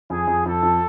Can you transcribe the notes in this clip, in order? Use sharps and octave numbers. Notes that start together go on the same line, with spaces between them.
F2 G#4
F2
F2 A4
F2